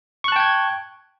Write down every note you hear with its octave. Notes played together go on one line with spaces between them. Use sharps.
G5 A5 C#6 F#6 G#6